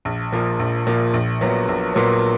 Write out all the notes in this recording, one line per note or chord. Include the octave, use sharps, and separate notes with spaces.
A#1
A#2 F3 A#3
A#1
A#2 F3 A#3
A#1
A#2 F#3 B3
A#1
A#2 F#3 B3